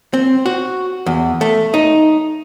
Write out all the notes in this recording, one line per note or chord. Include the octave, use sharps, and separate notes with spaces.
C4
F#4
E2
A3
D#4